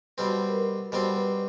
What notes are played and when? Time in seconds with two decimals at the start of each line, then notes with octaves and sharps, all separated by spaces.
0.18 B2 G3 C4 B4
0.49 A#4
0.55 B4
0.92 B2 G3 C4 C5
1.17 B4